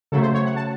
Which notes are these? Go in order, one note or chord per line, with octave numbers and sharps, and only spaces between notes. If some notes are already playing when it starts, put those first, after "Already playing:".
C#3 F#3 A3 A4
C5
C#5
F#5
A5